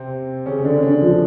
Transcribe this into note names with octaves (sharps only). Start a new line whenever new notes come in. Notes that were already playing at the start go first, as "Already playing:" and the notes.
Already playing: C3 C4
C#3 C#4
C#4
D3 D4
C#4
D3 D4
F3 F4